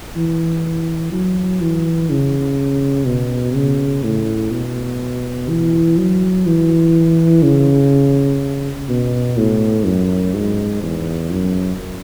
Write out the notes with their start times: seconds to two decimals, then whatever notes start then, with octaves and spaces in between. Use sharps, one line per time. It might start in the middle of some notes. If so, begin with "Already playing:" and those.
0.16 E3
1.12 F#3
1.61 E3
2.10 C#3
3.06 B2
3.55 C#3
4.04 A2
4.52 B2
5.49 E3
5.97 F#3
6.46 E3
7.43 C#3
8.89 B2
9.37 A2
9.85 F#2
10.34 G#2
10.83 E2
11.30 F#2